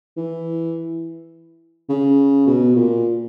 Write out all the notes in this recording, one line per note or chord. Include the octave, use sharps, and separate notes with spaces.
E3
C#3
B2
A#2